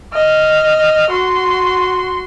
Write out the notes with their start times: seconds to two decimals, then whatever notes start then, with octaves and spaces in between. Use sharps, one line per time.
0.13 D#5 F6
1.10 F#4 C6